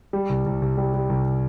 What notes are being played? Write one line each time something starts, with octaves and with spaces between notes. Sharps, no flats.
G3
C2
C2
C2
G3
G3
C2